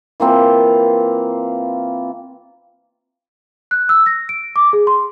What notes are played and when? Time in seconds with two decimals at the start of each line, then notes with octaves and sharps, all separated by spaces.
0.20 E3 A#3 C4 F4
3.71 F#6
3.89 E6
4.06 A#6
4.29 D7
4.56 D6
4.73 G#4
4.87 C6